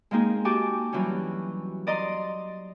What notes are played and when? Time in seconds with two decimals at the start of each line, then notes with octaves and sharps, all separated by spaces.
0.11 G#3 A#3 C4 D#4 G#4
0.45 F#4 G4 G#5 A5 D6
0.93 E3 F#3 G3 C#4
1.87 D5 D#5 A#5 C6 D#6